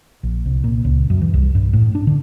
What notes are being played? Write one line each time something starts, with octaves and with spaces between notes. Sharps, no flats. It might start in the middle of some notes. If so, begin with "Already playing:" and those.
A#1
C2
A#2
C#2
F#2
E3
C2
G2
A2
D4
D3